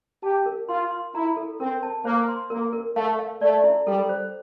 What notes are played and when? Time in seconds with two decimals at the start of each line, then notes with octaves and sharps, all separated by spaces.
0.23 G4 A5
0.46 A#4
0.69 F4 C6
0.91 C6
1.14 E4 A#5
1.37 A4
1.60 C4 A#4
1.83 A5
2.05 A#3 C5
2.28 C6
2.50 A#3 A#4
2.73 A#4
2.96 A3 F5
3.19 F5
3.41 A3 D5
3.64 E4
3.87 G3 A4
4.09 C5